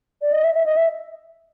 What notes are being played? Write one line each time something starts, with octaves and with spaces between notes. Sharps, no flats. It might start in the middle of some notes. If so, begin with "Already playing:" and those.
D5
D#5
E5
E5
D#5
E5